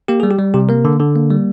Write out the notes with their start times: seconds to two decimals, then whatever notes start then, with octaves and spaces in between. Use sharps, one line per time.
0.08 A#3 G4
0.20 G3 G#4
0.31 G4
0.39 G3
0.54 C3 G4
0.69 A#3 A#4
0.85 D3
1.00 D3
1.16 A#3
1.31 G3